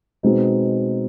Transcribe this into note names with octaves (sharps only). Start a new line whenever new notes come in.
B2 G#3 C4 D#4